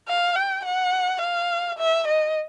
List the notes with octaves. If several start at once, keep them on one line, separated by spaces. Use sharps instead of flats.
F5
G5
F#5
F5
E5
D#5